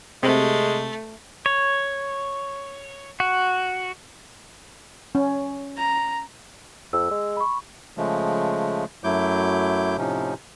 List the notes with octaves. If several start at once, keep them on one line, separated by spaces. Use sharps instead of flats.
C3 G#3 A3
C#5
F#4
C#4
A#5
F2 E6
G#3
B5 C#6
C#3 F3 G#3 A3
F#2 F#3 A3 E4 D6 G6
A2 C3 F3 C#4 D#4